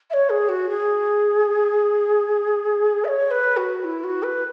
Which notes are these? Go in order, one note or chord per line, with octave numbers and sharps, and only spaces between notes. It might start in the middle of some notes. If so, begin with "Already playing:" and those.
E5
C#5
G#4
F#4
G#4
E5
C#5
B4
F#4
E4
F#4
B4